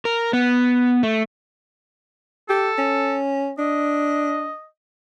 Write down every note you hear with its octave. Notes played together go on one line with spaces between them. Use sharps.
A#4
B3
A3
G4 A4
C#4
D4 D#5